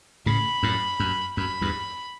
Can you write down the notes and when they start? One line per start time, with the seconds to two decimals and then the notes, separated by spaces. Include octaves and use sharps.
0.26 A2 C#3 B5
0.63 F#2 A2
1.00 F#2
1.37 F#2 B5
1.61 E2 G2